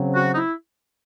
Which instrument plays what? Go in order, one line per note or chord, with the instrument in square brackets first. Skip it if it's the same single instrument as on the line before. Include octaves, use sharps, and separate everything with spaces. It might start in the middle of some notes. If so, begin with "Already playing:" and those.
Already playing: [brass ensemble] C#3 F#3 C4
[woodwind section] F#4
D#4
E4